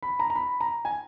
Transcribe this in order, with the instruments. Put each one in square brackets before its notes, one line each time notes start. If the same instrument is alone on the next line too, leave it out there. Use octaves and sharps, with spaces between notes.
[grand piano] B5
A#5
A#5
B5
A#5
G#5